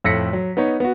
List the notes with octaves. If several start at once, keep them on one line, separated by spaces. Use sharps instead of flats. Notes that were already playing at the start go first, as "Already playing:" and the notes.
F2 A2 E6 A#6 B6 C#7
F#3
B3 D#4 C#5
B3 F#4